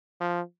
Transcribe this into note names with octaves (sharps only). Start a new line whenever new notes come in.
F3